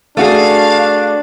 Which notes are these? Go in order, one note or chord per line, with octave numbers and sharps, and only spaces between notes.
A3 D4 F#4 G#4 F5